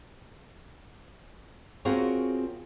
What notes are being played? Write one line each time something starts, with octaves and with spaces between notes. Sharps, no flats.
C4 F4 F#4 G#4 A#4 C#5